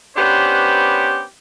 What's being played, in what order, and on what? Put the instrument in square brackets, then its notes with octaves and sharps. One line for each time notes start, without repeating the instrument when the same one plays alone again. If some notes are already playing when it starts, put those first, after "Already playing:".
[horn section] B3 C#4 D4 G4 B4 C5